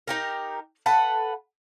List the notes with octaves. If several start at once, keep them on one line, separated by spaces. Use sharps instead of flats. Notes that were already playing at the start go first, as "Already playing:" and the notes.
D#4 G4 A#4
A4 B4 F#5